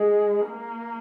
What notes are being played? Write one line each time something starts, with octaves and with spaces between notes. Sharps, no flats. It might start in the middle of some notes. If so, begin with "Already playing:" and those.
Already playing: G#3
A#3